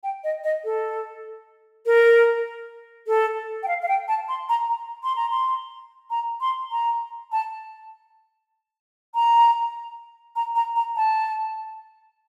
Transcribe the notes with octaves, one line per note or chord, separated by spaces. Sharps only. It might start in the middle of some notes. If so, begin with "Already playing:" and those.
G5
D#5
D#5
A4
A#4
A4
G5
F5
F5
G5
A5
C6
A#5
A#5
C6
A#5
C6
A#5
C6
A#5
A5
A#5
A#5
A#5
A#5
A5